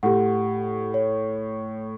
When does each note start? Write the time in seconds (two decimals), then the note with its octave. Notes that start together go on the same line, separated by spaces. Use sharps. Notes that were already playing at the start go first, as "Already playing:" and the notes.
0.03 A2 G4 F#5
0.94 C#5